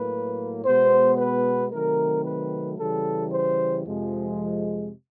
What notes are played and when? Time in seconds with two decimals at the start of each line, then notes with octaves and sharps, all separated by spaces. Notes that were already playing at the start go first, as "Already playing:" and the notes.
Already playing: A2 F#3 A#3 B4
0.65 B2 G#3 B3 C5
1.18 B4
1.71 C3 D#3 F#3 A3 C4 A#4
2.24 B4
2.78 C#3 E3 G3 A4
3.32 C5
3.85 F2 C3 F3 G#3